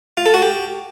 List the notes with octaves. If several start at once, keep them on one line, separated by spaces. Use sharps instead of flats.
F4
A4
F#4
G4